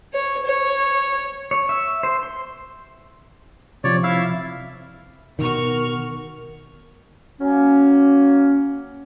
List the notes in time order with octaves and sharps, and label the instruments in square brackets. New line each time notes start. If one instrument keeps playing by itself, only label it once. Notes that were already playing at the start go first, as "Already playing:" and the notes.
[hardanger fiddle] C#5
C#5
[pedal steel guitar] C#5
E5
C5
C6
[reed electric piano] C3 F3 C4 [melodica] C#5 D5
[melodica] E4 E5 F5
[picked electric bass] B2 D#3 [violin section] F#4 C#6 F6 [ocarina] A#4
[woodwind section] F#3 A#3 C#4